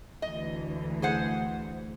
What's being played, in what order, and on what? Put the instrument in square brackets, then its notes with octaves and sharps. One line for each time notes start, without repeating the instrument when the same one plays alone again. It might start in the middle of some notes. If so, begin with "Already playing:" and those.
[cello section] D2 E3 [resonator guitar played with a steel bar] D#5
[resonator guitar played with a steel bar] G#4 C5 F#5